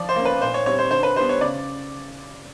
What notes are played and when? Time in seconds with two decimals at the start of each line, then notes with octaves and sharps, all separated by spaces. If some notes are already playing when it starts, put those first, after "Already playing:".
Already playing: F3 D5
0.09 C5
0.16 A#3 C#4
0.25 B4
0.42 A#2 C5
0.54 C#5
0.66 G3 C4 C#5
0.79 C5
0.91 D3 C5
1.03 B4
1.16 G3 B3 D4 C5
1.29 C#5
1.41 C#3 D5